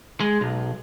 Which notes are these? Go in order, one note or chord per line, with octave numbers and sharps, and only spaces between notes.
G#3
B1